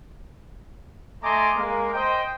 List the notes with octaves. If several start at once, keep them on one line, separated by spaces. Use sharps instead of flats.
A3 D#5 G#5 A#5 C6 D6
G#3 A#3
C5 D#5 G5